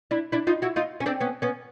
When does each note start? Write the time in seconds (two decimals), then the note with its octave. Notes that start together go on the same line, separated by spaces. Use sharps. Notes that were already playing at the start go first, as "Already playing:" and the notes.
0.11 D4 E4
0.32 D4 E4
0.47 D#4 F4
0.62 E4 F#4
0.76 D#4 F4
1.00 C#4
1.06 C4 D4
1.20 B3 C#4
1.42 B3 C#4